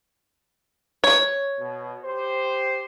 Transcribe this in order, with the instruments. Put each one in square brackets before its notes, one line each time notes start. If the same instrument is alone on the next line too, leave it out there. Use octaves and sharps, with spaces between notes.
[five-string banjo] C#5
[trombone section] B2
G4 C5